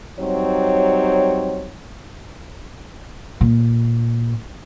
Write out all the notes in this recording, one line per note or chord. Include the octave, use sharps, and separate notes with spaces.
F#3 G3 C4 D#4 C#5
A#2